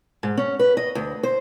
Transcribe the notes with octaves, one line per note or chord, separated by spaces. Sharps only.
G#2
C#4
B4
D#5
D2
C5